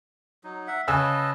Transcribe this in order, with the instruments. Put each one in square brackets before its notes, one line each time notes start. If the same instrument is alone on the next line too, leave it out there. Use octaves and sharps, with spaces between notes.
[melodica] F#3 D#4
E5 F#5
[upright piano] C#3 G#5 E6 [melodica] B4 D#5 A5